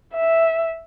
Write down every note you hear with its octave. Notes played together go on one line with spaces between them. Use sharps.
E5